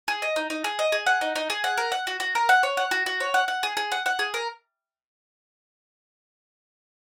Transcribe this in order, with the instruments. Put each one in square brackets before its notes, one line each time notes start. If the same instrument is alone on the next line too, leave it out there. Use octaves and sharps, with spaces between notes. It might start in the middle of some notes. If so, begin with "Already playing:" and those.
[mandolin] G#4
D#5
D#4
D#4
G#4
D#5
G#4
F#5
D#4
D#4
G#4
F#5
A#4
F#5
F#4
F#4
A#4
F#5
C#5
F#5
F#4
F#4
C#5
F#5
F#5
G#4
G#4
F#5
F#5
G#4
A#4